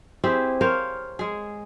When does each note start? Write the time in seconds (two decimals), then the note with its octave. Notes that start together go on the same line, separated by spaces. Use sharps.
0.24 C4 E4 G4 G#4
0.61 A#4 C5 C#5 F5
1.19 G#3 G#4